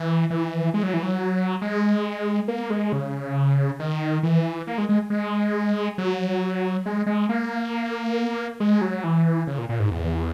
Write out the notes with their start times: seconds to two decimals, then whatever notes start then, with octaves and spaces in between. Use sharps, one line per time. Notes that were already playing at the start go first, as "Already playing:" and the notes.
Already playing: E3
0.30 E3
0.74 G#3
0.83 F#3
0.94 E3
1.03 F#3
1.61 G#3
2.48 A#3
2.70 G#3
2.92 C#3
3.80 D#3
4.23 E3
4.67 A#3
4.78 G#3
4.89 G#3
5.10 G#3
5.98 F#3
6.86 G#3
7.06 G#3
7.29 A#3
8.60 G#3
8.81 F#3
9.04 E3
9.47 C#3
9.58 A#2
9.69 A#2
9.80 G#2
9.91 E2